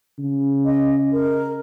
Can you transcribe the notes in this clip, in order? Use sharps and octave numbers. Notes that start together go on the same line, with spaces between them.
C#3
D#5
A#4